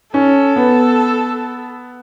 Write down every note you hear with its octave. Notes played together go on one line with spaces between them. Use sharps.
C#4 A4
B3